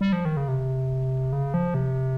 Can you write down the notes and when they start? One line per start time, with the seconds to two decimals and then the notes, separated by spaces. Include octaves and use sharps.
0.01 G3
0.13 F3
0.25 D#3
0.37 C#3
0.48 C3
1.33 C#3
1.54 F3
1.74 C3